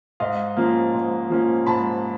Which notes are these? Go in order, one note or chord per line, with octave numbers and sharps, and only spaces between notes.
G#2 D#5 F5
F3 A#3 C#4
G#2
F3 A#3 C#4
G#2 A5 B5